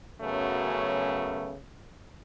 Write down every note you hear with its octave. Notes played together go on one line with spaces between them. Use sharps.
F#2 C#3 F#3 A3 B3 C#4